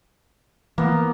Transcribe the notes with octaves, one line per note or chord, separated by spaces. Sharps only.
E3 A#3 B3